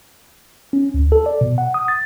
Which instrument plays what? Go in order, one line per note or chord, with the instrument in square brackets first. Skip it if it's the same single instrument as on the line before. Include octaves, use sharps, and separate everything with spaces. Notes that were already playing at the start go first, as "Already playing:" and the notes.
[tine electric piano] C#4
D2
A4
D5
B2
F#5
D#6
A6